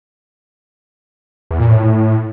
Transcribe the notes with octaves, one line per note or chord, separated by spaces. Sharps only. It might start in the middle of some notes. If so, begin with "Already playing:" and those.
E2
A#2
A2